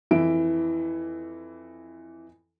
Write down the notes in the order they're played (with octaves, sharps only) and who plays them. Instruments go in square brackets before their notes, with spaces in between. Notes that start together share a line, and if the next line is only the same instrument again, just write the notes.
[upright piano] F2 E3 E4 E5 D7